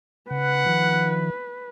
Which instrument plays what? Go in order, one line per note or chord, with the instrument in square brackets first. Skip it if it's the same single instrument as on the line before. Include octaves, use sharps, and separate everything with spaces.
[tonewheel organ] C#3 [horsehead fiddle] B4 [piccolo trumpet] F#5
[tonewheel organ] D#3 F3